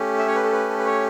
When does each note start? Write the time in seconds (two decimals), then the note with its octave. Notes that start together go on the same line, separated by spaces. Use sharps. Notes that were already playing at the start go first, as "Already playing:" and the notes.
Already playing: A3 C#4 G4
0.18 E5
0.27 C#5
0.35 B4
0.44 A4
0.52 B4
0.69 A4
0.78 B4
0.86 C#5